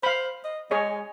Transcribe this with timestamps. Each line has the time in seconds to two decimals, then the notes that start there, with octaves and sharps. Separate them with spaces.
0.03 C5 F5 B5
0.44 D#5
0.71 G#3 G#4 C#5 D#5